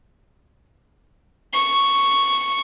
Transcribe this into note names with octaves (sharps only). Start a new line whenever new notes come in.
C#6